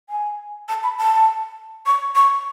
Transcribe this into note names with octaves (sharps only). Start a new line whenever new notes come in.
G#5
A5
B5
A5
C#6
C#6